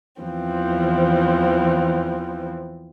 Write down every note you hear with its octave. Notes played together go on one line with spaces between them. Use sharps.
E2 E3 F3 C4